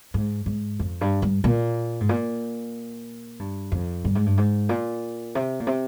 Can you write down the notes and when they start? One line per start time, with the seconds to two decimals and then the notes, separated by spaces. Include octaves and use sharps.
0.14 G#2
0.46 G#2
0.80 F2
1.01 G2
1.22 G2
1.44 A#2
2.00 G#2
2.09 A#2
3.39 G2
3.72 F2
4.05 G2
4.15 G#2
4.26 G2
4.37 G#2
4.69 A#2
5.35 C3
5.60 A#2
5.67 C3